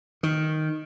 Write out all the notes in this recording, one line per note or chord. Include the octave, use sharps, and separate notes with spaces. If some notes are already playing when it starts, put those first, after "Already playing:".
D#3